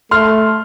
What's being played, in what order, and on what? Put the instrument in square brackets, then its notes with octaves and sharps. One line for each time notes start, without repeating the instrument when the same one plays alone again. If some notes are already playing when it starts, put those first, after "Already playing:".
[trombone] A3 [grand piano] C6 F6